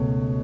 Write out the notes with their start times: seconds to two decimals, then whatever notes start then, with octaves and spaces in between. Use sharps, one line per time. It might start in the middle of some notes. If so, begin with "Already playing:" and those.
Already playing: C#2 B2 A3 C#5